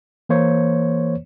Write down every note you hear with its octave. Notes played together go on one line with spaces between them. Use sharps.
E3 A#3 C5 C#5